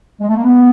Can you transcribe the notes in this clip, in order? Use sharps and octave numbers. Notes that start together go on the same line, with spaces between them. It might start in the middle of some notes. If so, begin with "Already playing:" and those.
G#3
A3
A#3
B3